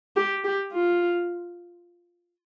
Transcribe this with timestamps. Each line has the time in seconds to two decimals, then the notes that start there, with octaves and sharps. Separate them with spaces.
0.16 G4
0.44 G4
0.72 F4